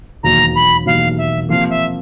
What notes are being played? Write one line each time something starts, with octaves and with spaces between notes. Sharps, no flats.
E1 D#2 D#3 F#3 A#3 A#5
B5
E1 D#2 D#3 F#3 A#3 F5
E5
C3 F3 A#3 F5
E5